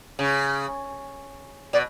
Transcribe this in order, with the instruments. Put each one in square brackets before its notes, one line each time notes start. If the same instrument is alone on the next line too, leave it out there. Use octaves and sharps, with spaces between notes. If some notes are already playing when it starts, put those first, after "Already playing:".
[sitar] C#3
[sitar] B2 [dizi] D5